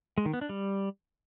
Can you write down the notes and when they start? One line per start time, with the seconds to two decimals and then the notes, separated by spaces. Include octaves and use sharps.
0.18 G#3
0.26 D#3
0.33 B3
0.41 D4
0.49 G3